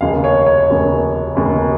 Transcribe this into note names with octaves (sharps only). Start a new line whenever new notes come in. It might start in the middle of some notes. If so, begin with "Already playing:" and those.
F1 D#2 C#3 F5
C#5
C#5
F1 D#2 C#3
F1 D#2 C#3